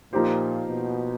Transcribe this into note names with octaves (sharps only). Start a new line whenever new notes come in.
A#2 F3 A#3 D#4 G4 C5
B2